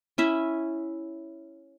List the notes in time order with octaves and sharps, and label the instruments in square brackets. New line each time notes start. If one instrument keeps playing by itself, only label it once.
[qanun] C#4 E4 E5